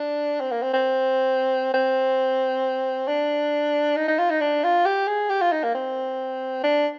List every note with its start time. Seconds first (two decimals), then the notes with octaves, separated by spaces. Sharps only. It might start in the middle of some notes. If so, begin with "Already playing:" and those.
Already playing: D4
0.40 C4
0.51 A#3
0.62 C4
0.73 C4
1.74 C4
3.08 D4
3.96 D#4
4.08 D#4
4.19 F4
4.30 D#4
4.41 D4
4.64 F4
4.85 G4
5.07 G#4
5.30 G4
5.41 F4
5.52 D#4
5.63 A#3
5.75 C4
6.64 D4